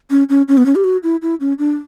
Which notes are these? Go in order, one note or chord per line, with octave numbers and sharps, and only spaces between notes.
C#4
C#4
C#4
B3
C#4
G4
F#4
E4
E4
C#4
D4